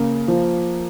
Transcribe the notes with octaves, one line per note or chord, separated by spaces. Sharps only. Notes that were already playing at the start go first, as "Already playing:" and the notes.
Already playing: C#3 A#3
F3